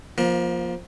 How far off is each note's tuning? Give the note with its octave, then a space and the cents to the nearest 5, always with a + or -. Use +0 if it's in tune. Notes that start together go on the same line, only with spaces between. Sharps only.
F3 +0 A#3 +25